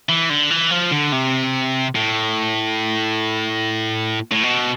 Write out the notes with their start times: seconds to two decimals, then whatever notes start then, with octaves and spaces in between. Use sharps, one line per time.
0.09 E3
0.30 D3
0.51 E3
0.71 F3
0.91 D3
1.12 C3
1.95 A2
4.31 A2
4.43 B2